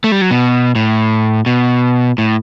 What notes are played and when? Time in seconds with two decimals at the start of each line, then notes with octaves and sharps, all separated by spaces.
0.04 A3
0.12 G3
0.22 F#3
0.31 B2
0.75 A2
1.46 B2
2.18 A2